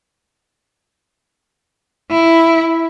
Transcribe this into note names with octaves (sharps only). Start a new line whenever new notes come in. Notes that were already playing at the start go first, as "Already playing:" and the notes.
E4